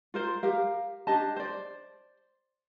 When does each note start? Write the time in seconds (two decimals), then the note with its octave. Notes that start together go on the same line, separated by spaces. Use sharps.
0.14 F4 A#4 C5
0.43 G4 A#4 F5
1.07 D4 G4 D#5 A5
1.36 C5 D5